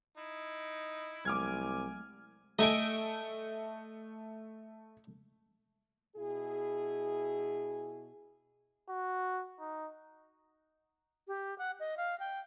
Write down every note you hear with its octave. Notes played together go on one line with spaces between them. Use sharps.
D#4 E4
C2 F#3 G#3 A3 G#5 D6 F6 G#6
A3 D#5 E5 G#5 D7
B2 E4 G#4
F#4
D#4
G4
F#5
D#5
F5
G5